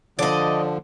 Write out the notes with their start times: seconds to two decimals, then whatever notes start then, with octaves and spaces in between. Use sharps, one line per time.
0.19 D3 F3 D5 D#5